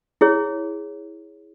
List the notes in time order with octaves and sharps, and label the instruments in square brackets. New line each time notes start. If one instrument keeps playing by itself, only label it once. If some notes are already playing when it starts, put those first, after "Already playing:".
[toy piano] E4 G#4 C#5